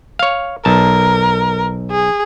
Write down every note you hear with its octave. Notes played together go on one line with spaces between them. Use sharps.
C#5 F5
B1 A#4 A5
G#4